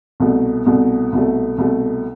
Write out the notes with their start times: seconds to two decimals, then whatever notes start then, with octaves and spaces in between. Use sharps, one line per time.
0.20 C2 B2 A3
0.66 C2 B2 A3
1.12 C2 B2 A3
1.58 C2 B2 A3